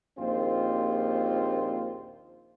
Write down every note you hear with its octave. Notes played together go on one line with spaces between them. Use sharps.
A#1 D#2 C4 F4 C5